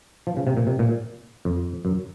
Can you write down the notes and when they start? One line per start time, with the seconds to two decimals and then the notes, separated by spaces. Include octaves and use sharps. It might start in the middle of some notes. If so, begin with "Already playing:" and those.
0.27 F3
0.37 C#3
0.47 C3
0.57 A#2
0.67 C3
0.79 A#2
1.45 F2
1.85 F#2